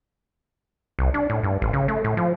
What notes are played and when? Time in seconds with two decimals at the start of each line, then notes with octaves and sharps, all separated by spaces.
0.99 C2
1.14 D4
1.30 A2
1.43 G2
1.62 A1
1.73 C#3
1.88 A3
2.04 A2
2.17 F3